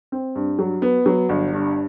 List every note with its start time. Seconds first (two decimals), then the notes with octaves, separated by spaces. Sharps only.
0.12 C4
0.35 G2
0.59 F#3
0.82 B3
1.06 F#3
1.29 G1
1.53 G2